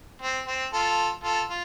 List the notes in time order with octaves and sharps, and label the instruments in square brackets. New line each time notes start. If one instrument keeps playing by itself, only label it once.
[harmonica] C4
C4
F4 A4
F4 A4
F4